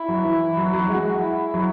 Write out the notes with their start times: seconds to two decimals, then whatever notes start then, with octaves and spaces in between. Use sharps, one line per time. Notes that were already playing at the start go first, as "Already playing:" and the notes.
Already playing: E4
0.08 F#3
0.25 E3
0.57 F#3
0.73 F#3
0.89 G#3 F#4
1.22 E4
1.54 F#3